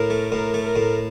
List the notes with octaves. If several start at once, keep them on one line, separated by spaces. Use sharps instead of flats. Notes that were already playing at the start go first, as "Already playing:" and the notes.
Already playing: A2 A#4
A3
A2 A#4
A3
A#4
A2